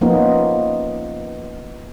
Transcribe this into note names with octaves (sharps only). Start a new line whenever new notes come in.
F3 A#3 B3 C#4 D#4 F4